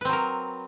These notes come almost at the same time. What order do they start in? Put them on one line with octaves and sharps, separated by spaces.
B4 C4 F#3 A#4